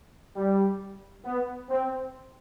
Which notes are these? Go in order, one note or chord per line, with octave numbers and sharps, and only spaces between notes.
G3
B3
C4